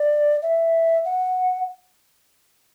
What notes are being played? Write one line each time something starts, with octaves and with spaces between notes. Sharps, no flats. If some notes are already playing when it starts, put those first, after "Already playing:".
Already playing: D5
E5
F#5